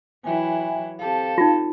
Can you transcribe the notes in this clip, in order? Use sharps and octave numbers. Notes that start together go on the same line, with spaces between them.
E3 F#3 E4 E5 G5 G#5
C4 G4 A4 F5 A5
D#4 F4